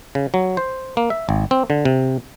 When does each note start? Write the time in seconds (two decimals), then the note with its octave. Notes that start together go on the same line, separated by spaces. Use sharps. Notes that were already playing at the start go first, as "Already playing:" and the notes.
0.15 C#3
0.34 F#3
0.57 C5
0.97 A#3
1.10 E5
1.29 G#1
1.51 C4
1.70 D3
1.85 C3